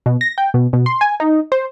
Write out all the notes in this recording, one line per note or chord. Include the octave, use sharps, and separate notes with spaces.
B2
A#6
G5
B2
B2
C6
G#5
D#4
C5